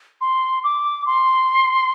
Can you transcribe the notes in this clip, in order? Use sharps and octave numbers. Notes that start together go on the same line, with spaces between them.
C6
D6
C6